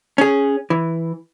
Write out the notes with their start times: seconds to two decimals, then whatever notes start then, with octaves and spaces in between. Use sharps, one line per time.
0.18 C#4 G#4
0.70 E3